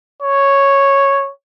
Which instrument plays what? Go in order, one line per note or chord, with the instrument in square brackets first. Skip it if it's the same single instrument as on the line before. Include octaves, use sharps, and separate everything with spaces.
[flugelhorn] C#5